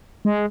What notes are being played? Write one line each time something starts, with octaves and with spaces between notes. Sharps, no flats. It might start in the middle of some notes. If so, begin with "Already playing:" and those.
G#3